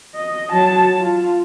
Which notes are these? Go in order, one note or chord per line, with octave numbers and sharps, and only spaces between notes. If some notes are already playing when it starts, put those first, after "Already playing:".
D#5
F#3 A5
F4